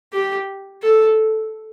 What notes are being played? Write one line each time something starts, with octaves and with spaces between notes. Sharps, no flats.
G4
A4